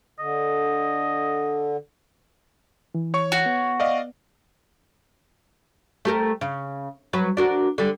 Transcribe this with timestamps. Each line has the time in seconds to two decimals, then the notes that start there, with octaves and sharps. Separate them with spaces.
0.19 D3 D#5
2.95 E3
3.14 C#5 C#6
3.32 F#4
3.46 B3
3.80 D5 D#5 F5
6.05 A3 G4 A#4
6.41 C#3
7.13 F#3 B4
7.37 D4 F#4 A#4
7.78 D3 G3